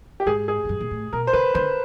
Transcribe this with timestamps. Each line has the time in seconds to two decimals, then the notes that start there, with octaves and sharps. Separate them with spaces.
0.20 G4
0.26 G#2 G#4
0.48 G#4
0.65 G#2
0.69 G2
0.80 A#2
0.91 A2
1.13 B2 A#4
1.27 C5
1.33 C#3 B4
1.54 D3 C5